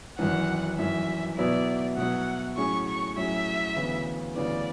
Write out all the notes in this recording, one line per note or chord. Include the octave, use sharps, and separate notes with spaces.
G#1 F#2 E3 F#5
G#1 F#2 E3 E5
B2 F#3 B3 E4 D5
B2 F#3 B3 E4 F#5
A2 F#3 C#4 G#4 C#6
C#6
A2 F#3 C#4 G#4 E5
D2 C#3 E3 B3
D2 C#3 E3 B3 D5